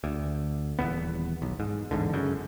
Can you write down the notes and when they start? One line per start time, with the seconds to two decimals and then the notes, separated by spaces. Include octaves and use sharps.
0.04 D2
0.79 D#1 E2 B3
1.42 B1
1.60 G#2
1.91 A1 E2 G#2 D3
2.13 F#2 C#3